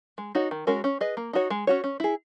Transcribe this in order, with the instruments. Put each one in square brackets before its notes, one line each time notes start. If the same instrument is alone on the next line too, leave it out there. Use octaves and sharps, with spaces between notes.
[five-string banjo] G#3
D#4 F#4 C#5
D#3
G#3 C#4 F#4 A#4
C#4
G#4 B4 D#5
A#3
D#4 F#4 C#5
G#3
C#4 F#4 C#5
C#4
E4 G#4